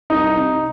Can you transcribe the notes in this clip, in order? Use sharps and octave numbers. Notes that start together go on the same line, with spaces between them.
C2 D#4
C3